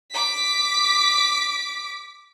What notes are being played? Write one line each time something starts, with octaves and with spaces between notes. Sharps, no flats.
D6 B6